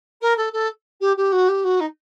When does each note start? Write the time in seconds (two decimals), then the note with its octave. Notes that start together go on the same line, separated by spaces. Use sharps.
0.21 A#4
0.37 A4
0.52 A4
1.00 G4
1.16 G4
1.32 F#4
1.48 G4
1.64 F#4
1.80 D#4